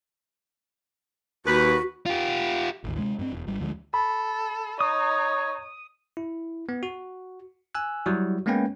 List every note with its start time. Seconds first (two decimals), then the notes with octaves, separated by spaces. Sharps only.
1.46 D#2 F#4 B4
2.06 F4 G4
2.84 A1 D#2
2.98 C3 G#3
3.19 G2 G#3 C4
3.33 E1
3.47 G#1 G3
3.61 D2 D3 F3 G#3
3.94 A4 B5
4.81 D#4 C#5 D#6
6.17 E4
6.69 B3
6.83 F#4
7.75 G#5 E6 F#6
8.06 F#3 G3 E4 F#4
8.46 G#3 A#3 B3 C#4 B4 G5